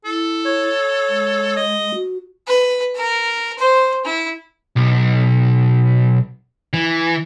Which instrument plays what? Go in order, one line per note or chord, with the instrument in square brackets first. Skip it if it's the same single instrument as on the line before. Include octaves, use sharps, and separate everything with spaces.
[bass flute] E4 [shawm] A4
[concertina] C#5
[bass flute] G#3
[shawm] D#5
[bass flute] F#4
[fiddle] B4
A#4
C5
E4
[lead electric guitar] B1
E3